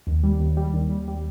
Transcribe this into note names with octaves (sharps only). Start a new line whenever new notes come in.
D#2
G3
D#2
G3
D#2
G3
G3